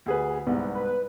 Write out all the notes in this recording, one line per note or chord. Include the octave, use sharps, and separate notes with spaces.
D2 G#4 B4
C2 G#2 B3
B4